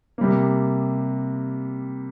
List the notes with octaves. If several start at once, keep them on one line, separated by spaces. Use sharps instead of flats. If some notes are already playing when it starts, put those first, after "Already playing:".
C3 G3 A#3